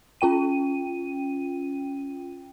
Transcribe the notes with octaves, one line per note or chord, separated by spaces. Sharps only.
C#4 F4 G5 D#7